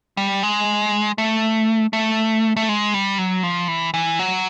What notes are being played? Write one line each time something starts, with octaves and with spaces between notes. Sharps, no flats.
G3
G#3
A3
A3
A3
G#3
G3
F#3
F3
E3
E3
F#3